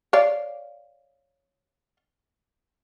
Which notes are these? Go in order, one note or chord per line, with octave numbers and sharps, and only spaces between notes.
C#5 D5 F5